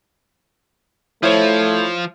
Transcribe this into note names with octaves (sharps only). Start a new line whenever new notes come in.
F3 A3 E4 C5 C#5